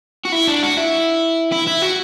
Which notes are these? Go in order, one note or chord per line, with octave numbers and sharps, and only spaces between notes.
F#4
E4
D4
F#4
E4
E4
E4
F#4